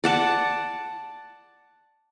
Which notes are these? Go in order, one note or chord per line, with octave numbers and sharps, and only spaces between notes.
D5 F#5 A5